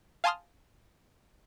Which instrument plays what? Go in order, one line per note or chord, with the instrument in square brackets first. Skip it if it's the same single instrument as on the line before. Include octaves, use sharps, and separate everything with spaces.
[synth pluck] F5 G#5 A5 C6 D#6 F6